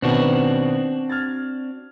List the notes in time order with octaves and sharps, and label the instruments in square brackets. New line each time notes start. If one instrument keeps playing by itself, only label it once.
[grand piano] B2 D#3 B3 [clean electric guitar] C4 D4 F#4
[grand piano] F6 G#6 A6